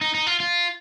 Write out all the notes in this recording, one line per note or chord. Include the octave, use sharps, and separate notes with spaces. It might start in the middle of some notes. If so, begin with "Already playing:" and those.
D#4
D#4
F4
F4